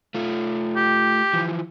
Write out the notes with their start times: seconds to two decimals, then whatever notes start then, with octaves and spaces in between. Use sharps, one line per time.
0.14 A3 F4
0.76 G4
1.33 E3 F3